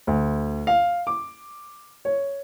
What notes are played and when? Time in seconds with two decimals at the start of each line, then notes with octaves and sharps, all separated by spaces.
0.07 D2
0.67 F5
1.07 D6
2.05 C#5